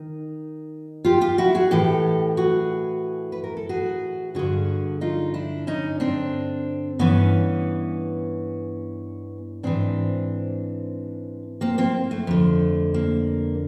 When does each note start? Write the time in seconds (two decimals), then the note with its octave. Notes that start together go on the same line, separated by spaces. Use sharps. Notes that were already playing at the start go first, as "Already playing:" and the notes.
Already playing: D#3 D#4
1.05 F4 G4
1.21 F4 G4
1.38 E4 F#4
1.55 F#4 G#4
1.71 A2 E3 G4 A4
2.37 F#4 G#4
3.32 B4
3.44 A#4
3.57 A4
3.69 F#4 G#4
4.35 G2 D3 F#4 G#4
5.01 D#4 F4
5.34 D4 E4
5.67 C#4 D#4
6.00 C4 D4
6.99 G2 E3 B3 C#4
9.63 G#2 E3 C4 D4
11.61 A#3 C4
11.78 A#3 C4
12.11 A3
12.27 F2 D3
12.94 A#3